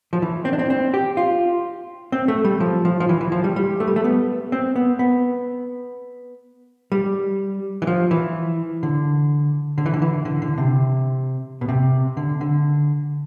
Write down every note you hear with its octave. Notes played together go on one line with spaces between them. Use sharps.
F3
E3
C4
D4
C4
C4
G4
F4
C4
A3
G3
F3
F3
F3
E3
E3
F3
G3
G3
A3
G3
A3
B3
C4
B3
B3
G3
E3
F3
E3
D3
D3
E3
D3
E3
D3
D3
C3
B2
C3
D3
D3